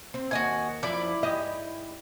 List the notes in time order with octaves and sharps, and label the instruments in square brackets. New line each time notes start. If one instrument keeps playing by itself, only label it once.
[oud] C4
[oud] D#2 D#5 [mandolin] F#4 G#5
[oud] F#2 F3 [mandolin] E4 D5
[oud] G#2 G4 D#5